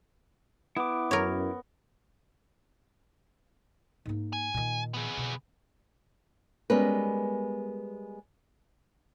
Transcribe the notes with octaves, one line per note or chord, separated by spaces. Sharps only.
B3 E4 D6
F#2 A#4 C#5
G#2 A#3
G#5
A#2 D#3
B3 G#4
B2 D3
G3 G#3 B3 C#4 A#4 B4